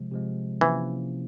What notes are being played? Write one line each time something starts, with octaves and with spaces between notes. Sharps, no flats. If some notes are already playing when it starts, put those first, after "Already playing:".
Already playing: C3 F3 G#3
C3 F3 G#3
C3 E3 F3 A#3 C#4 E4